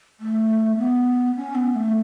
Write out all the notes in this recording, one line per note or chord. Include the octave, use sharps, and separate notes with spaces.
A3
B3
C#4
B3
A3